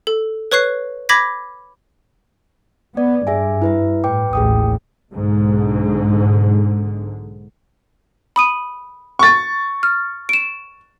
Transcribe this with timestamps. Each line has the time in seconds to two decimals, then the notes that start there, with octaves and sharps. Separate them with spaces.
0.07 A4
0.52 B4 C#5 C#6 F#6 C7
1.09 B5 D6 G#6 A#6 B6
2.97 B3 D5
3.27 G2 G#4 E5 G#5
3.62 E4 B4 E5
4.04 A2 B4 G5 D6
4.33 A1 D#2 A2 G#4 G5 D#6
5.14 B1 G#2 D3
8.36 B5 D#6 D#7
9.19 C#6 A6
9.83 F6
10.29 D7 E7